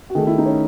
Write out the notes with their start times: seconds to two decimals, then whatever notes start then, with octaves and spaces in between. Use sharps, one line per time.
0.10 F#4
0.15 D#3 A3 G#4
0.27 E4
0.38 D#4
0.45 C#4